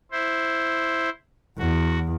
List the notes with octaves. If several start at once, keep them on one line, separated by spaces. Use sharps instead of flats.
E4 C5
E2 F#4